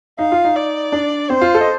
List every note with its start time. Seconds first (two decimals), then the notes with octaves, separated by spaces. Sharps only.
0.19 D#4 F5
0.32 F4
0.45 D#4
0.56 D5
0.92 D4
1.30 C4 C5
1.41 F4
1.55 A4
1.61 D#5